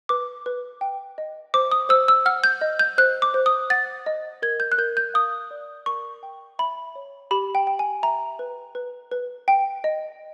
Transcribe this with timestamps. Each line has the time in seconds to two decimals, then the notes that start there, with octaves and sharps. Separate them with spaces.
0.09 B4 D6
0.46 B4
0.81 G5
1.18 D#5
1.54 C5 D6
1.71 D#6
1.89 C5 E6
2.08 E6
2.26 F#5 F6
2.44 G6
2.61 D#5
2.79 G6
2.98 C5 F#6
3.22 D6
3.34 C5
3.46 D#6
3.70 F#5 A6
4.06 D#5
4.42 A#4 G#6
4.60 G6
4.72 F#6
4.78 A#4 G6
4.97 G6
5.14 F5 D#6
5.51 D5
5.86 A#4 C#6
6.23 G5
6.59 E5 B5
6.95 C#5
7.31 G4 B5
7.55 G5
7.67 G5
7.79 G#5
8.03 E5 A#5
8.39 B4
8.75 B4
9.12 B4
9.48 G5
9.84 D#5